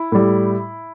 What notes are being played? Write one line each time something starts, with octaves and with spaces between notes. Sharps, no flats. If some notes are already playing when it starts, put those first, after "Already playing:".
Already playing: E4
A2 G3